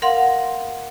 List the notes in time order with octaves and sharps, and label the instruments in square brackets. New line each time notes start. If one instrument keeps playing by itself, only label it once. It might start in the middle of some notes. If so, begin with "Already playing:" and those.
[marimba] A#4 F5 F#5 C6